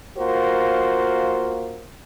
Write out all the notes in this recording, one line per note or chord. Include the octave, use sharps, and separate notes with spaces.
A#3 F4 F#4 A#4 C5